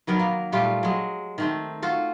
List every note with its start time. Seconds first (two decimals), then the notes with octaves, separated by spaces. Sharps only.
0.07 D#3 F#3 B3 A#4
0.19 A#3
0.52 A#2 G3 A3 F4
0.83 F#3 G#3
1.38 D#3 A3 C4
1.82 F4 F#4 A4